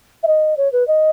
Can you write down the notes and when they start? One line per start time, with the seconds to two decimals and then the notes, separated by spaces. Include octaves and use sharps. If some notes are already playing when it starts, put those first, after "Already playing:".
0.23 E5
0.27 D#5
0.57 C#5
0.72 B4
0.88 D#5